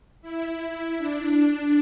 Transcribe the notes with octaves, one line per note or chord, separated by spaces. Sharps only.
E4
D4